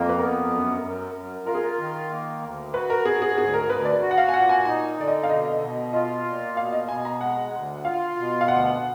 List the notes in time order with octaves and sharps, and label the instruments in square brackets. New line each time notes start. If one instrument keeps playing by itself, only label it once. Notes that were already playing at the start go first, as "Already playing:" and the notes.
Already playing: [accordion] F2 A#3
[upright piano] B4
[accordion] B3 [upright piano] A#4
[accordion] F#2
F#2
F#2
[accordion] F4 [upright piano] A#4
[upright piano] G#4
A#4
[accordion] D#3
A#3
D2
[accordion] F#4 [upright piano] B4
[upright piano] A#4
[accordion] G#2 [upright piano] G#4
[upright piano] G#4
[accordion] D2 [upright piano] G#4
[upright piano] A#4
[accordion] D2 [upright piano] B4
[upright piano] D5
[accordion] F#4
[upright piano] F#5
F5
G#5
[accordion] A#2 [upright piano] F#5
[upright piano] G#5
[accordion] D#4 [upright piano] G#5
[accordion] D3 [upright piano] D5
[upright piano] D#5
F5
[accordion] B2 [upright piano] D#5
[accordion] B2
[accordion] F4 [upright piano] D#5
[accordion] A#2
[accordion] B2 [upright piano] F5
[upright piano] D#5
[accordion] B2 [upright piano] G#5
[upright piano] A#5
[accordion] G#3 [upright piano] F#5
[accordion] D2
[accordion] F4 [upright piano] F5
[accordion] B2
[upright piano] F5
[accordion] D2 [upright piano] F#5